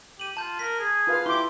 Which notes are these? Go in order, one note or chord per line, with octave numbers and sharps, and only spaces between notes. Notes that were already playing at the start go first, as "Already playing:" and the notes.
G4 D#7 F#7
F4 A5 G6
A#4 B6
G#4
F4 B4 F5
E4 G4 C6 D6